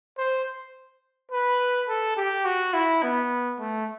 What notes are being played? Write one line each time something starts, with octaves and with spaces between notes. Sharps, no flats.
C5
B4
A4
G4
F#4
E4
B3
A3